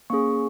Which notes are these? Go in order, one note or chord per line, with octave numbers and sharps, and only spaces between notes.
A#3 C#4 G#4 C#6